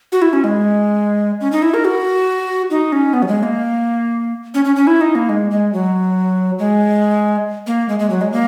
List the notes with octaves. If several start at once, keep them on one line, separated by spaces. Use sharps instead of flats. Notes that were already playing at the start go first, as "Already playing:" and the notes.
F#4
E4
C#4
G#3
C#4
D#4
E4
A#4
F#4
D#4
C#4
B3
F#3
G#3
A#3
C#4
C#4
C#4
E4
D#4
A#3
G#3
G#3
F#3
G#3
A#3
G#3
G#3
F#3
G#3
A#3